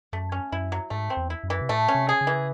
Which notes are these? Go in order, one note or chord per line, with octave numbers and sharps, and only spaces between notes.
F#2 A3
C#4
F#2 E4
F#3
G#2 A3
C4
E2
E4
F#2
E3
C3
A2 A3
C#4
C3
G#4
C#3
E3